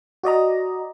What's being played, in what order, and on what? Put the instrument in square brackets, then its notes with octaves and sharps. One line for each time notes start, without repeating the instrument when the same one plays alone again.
[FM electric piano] F#4 D5 D#5 A#5